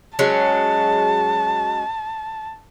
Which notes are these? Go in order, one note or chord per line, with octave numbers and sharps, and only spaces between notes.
F#3 G#3 C#4 A5